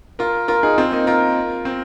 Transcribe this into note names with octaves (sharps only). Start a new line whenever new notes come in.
F4 A#4
F4 A#4
D#4 G#4
C4 F4
A#3 D#4
F4 A#4
C4